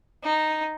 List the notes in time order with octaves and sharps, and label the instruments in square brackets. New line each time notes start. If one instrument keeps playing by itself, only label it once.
[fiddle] D#4